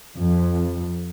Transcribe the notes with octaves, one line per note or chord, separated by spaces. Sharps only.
F2